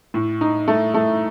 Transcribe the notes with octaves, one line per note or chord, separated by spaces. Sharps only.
A2
D#4
A3
A3